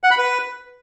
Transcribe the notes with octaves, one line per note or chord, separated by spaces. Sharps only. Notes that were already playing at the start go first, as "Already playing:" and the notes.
F#5
B5
B4